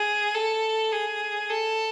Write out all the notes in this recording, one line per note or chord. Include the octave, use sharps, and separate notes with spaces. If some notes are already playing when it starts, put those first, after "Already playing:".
Already playing: G#4
A4
G#4
A4